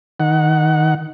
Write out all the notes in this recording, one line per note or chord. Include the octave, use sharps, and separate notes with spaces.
D#3 F#5